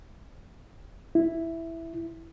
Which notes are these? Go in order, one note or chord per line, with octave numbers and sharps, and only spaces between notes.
E4